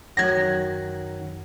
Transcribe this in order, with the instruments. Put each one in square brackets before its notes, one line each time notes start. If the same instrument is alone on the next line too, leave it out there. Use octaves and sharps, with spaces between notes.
[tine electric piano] F#2 D#3 F#6 [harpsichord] F#3 [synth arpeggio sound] G#6 A#6